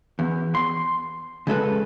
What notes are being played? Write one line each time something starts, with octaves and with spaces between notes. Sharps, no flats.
E2
C6
C#3 G#3 A4 B4